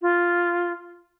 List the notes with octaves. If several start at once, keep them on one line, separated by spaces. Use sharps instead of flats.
F4